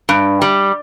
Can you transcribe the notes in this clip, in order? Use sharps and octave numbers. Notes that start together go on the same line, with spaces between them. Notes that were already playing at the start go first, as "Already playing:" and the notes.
G2
G3